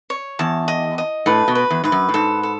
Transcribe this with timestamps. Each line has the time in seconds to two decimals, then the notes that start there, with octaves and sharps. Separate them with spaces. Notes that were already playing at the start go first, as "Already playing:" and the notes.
0.10 C#5
0.39 E2 A5
0.68 D#5
0.98 D#5
1.26 A2 B4
1.48 B2
1.55 B4
1.70 E2
1.84 G#2 B4
1.92 F#2
2.09 A2
2.14 G#2 A4
2.43 A4